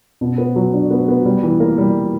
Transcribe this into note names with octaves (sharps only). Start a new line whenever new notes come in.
B2
B3
F#3
D4
B3
B3
G3
E3
A#3
G3